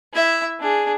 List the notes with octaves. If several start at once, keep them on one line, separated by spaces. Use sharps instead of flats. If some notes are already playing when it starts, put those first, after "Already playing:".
E4 E5
D4 G#4